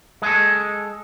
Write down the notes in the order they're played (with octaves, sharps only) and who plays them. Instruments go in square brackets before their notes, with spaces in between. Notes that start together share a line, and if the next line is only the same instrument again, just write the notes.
[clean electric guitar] G#3 A4